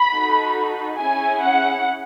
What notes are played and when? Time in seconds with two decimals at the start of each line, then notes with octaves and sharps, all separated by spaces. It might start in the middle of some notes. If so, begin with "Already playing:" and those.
Already playing: B5
0.10 D#4 F#4 A4
0.99 C#4 E4 G#4 G#5
1.42 F#5